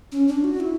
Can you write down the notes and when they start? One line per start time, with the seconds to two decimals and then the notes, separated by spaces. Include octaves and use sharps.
0.12 C#4
0.28 D4
0.44 F#4
0.60 E4